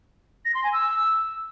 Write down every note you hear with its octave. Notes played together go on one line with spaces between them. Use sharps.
A#6
C6
G#5
E6